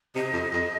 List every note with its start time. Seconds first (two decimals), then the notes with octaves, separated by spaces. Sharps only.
0.15 C3 D#5
0.33 F2
0.53 F2